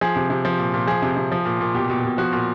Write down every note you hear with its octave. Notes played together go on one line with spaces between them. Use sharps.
F3 G#4
C3
C3
F3
A#2
A#2
F3 G#4
C3
C3
F3
A#2
A#2
B2 G4
B2
B2
F3 F#4
A#2